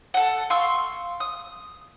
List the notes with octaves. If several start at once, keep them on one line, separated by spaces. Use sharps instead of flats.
A4 F#5
F5 C6 C#6 E6
D#6